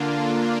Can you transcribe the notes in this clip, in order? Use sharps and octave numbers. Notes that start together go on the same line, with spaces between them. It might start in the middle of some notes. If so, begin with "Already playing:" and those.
Already playing: D3 A#3 D4 F4